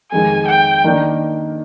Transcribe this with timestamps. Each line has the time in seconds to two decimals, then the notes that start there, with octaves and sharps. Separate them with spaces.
0.11 F2 D#3 G#3 G#5
0.48 G5
0.84 D#3 A#3 D4